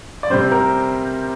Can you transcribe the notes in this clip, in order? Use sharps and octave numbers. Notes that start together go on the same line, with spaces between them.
D5
C3 G3 C4 C5
A#4